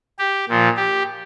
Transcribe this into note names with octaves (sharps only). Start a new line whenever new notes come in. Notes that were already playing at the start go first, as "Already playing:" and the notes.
G4
A#2 F3
G4